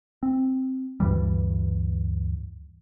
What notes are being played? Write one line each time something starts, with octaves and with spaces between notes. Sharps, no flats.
C4
D2 G2 E3 G3